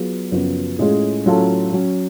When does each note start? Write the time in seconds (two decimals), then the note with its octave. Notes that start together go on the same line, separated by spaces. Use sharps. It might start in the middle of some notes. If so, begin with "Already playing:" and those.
Already playing: F#3 B3 F4 G#4
0.32 F#2 C#3 F3 B3 F#4
0.79 A2 G#3 C#4 F4 G#4
1.26 A2 F#3 C#4 F4 A4
1.72 F#3 C#4 F#4